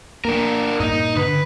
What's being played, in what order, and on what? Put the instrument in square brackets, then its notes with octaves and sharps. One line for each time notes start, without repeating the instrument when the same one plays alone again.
[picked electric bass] A#3 [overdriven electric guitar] D4 A#4
[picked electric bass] G2 A#2 A#3 [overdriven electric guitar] D#4
[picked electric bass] D3 [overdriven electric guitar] B4